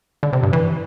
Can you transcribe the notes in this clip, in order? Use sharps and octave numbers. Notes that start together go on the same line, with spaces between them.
D3
C3
G2
E3